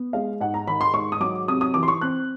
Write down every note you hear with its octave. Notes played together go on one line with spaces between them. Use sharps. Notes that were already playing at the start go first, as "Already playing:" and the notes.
Already playing: B3
G#3 F5
G#2 F#5
A#5
D#3 B5
C6
G#2 C#6
D#6
F#3 D6
C3 D#6
D#6
E3 D6
C6
C#6
C4 F#6